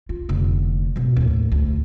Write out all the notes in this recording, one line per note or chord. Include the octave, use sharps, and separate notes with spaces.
F4
F1 D3
G#2 B2
D#2 A2
D2